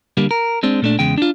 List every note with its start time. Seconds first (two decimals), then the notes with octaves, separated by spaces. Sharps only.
0.17 D3 G3 A#3
0.31 A#4
0.63 G#3 C4 D4
0.82 A#2 A3 D4
0.99 E2 C#3 G#3 G5
1.18 D4 F4